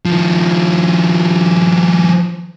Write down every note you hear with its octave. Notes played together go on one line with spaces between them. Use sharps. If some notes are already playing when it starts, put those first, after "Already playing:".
D#3 F3